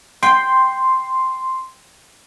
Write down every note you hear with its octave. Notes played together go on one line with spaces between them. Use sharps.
G5 C6